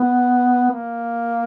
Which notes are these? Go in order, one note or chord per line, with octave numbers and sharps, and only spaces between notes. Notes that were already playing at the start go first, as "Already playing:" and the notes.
Already playing: B3
A#3